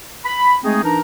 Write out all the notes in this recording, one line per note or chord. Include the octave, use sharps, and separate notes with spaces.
B5
G#3 A3 C4 D#4 G#4
E3 D4 D#4 A#4 A#5